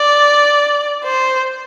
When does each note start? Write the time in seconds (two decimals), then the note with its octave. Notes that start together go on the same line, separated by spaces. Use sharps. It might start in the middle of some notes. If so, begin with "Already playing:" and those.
Already playing: D5
1.04 C5